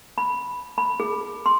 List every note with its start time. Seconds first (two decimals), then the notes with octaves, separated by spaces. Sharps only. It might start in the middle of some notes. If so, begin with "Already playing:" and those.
0.18 B5
0.78 B5
1.00 G#4
1.46 C6